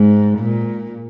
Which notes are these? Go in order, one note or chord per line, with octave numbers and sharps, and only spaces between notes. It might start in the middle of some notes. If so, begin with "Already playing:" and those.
Already playing: G#2
A#2